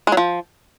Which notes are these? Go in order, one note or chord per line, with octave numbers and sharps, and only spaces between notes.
G#3
F#3
F3